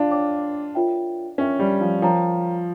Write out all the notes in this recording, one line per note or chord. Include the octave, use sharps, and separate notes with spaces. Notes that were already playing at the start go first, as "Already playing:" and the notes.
Already playing: D4 F4
C#5 G5 D6
F4 A#4 C#5 E5 G5
C#4 F4 A#4 C#5 E5 G5
G3
F3
F3 A#4 C#5 G5 A#5